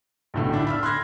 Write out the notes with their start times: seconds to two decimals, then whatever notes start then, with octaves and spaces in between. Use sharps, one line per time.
0.34 B1 A2 D3
0.53 D4 E4
0.67 B5 E6 F6
0.83 C6 F#6 G#6 A#6